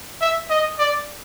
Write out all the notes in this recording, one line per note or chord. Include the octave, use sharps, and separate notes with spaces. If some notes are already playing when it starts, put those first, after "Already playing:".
E5
D#5
D5